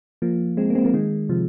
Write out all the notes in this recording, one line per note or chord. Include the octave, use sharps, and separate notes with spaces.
F3 A#3
G#3 C4
A#3
G#3 C4
F3 A#3
D#3 G#3
C3 F3